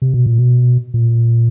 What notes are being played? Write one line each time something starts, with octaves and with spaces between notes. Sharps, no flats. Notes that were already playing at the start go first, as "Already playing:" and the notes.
C3
B2
A#2
B2
A#2